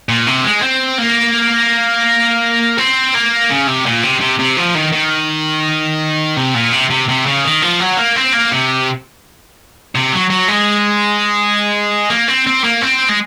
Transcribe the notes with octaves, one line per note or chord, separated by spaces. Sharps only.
A#2
C3
G#3
C4
A#3
C4
A#3
C#3
C3
A#2
C3
C3
C3
F3
D#3
D#3
C3
A#2
C3
C3
C3
C#3
D#3
F3
F#3
A#3
C4
A#3
C3
C3
F#3
F#3
G#3
A#3
C4
C4
A#3
C4
G#3